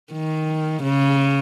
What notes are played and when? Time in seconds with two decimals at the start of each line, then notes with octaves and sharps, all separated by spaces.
0.12 D#3
0.83 C#3